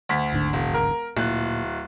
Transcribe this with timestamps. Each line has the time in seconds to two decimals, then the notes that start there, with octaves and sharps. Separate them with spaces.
0.09 D2 B6
0.32 D1 G#1 D3
0.53 E1
0.74 A#4
1.17 D1 A#2 F#6